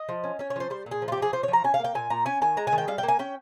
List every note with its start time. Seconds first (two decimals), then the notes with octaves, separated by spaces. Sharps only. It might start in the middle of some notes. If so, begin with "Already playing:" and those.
Already playing: D#5
0.09 F3
0.24 C#4
0.39 C#4 C#5
0.50 C#5
0.56 F3 C5
0.70 G3 C5
0.86 A#2
0.91 G#4
1.02 F3
1.08 F4
1.12 G4
1.17 F3
1.22 G#4
1.33 F3 C5
1.43 C#5
1.48 F3
1.53 A#5
1.64 C#4 G#5
1.74 F5
1.79 A#3
1.84 G5
1.94 A#2 G#5
2.10 A#2 A#5
2.26 C#4 G#5
2.42 D#3 G#5
2.57 G#3 A#5
2.67 G#5
2.72 D#3
2.78 G5
2.88 G3 F5
2.98 G5
3.03 A#3
3.08 G#5
3.19 C#4 G5